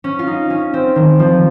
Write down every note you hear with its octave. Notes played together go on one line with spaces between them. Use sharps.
C#4
F4
D#4
C#4
C4
D#3
F3